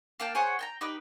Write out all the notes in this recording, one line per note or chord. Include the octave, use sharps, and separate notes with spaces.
A#3 F5 G5 A5
G#4 C5 C#5 F#5
G5 A5 A#5
D#4 G4 B4